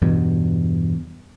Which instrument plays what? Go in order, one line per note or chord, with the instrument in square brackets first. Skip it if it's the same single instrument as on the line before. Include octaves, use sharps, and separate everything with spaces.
[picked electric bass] E2 G2 B2